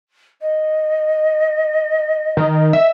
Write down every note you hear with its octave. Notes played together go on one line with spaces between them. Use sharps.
D#5
D#3
E5